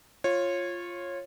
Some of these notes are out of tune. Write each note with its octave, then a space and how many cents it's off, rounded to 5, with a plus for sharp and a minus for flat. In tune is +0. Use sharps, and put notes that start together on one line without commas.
F4 +0 C#5 -20